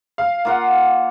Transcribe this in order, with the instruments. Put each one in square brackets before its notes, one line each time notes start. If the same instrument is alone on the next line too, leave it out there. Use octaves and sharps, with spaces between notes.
[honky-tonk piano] F5
[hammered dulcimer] A#3 F4 F#5